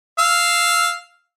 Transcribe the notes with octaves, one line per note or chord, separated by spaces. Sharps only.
F5 E6